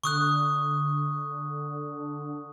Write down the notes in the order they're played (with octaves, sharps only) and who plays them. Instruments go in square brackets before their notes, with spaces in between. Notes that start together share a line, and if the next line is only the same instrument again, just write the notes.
[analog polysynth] D3 [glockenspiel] C#6 D#6 F#6